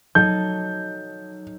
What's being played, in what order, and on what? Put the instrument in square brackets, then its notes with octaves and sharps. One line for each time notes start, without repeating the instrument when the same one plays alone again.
[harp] F#3 D#4 A4 [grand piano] G6